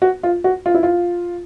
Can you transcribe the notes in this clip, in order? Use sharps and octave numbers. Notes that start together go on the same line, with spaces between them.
F#4
F4
F#4
F4
E4
F4